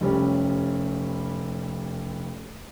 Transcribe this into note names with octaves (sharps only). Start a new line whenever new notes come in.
F1 G3 C#4